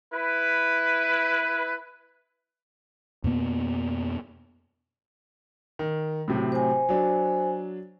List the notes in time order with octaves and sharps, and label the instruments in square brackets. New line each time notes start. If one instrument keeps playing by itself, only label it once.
[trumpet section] E4 B4
[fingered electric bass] F2 B2 A#3 B3
[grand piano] D#3
A2 C3 F#3
[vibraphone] C5 G#5
[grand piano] F#3 D4